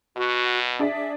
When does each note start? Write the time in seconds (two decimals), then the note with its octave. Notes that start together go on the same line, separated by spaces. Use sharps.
0.17 B2 F#4
0.79 D4 G#4 D5 E5